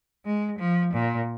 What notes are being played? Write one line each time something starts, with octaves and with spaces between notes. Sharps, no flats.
G#3
F3
A#2